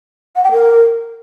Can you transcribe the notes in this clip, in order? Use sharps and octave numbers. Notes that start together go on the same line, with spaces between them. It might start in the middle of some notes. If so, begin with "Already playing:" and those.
F#5
G5
A#4